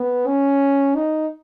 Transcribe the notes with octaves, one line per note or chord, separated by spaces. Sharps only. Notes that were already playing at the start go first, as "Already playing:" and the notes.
Already playing: B3
C#4
D#4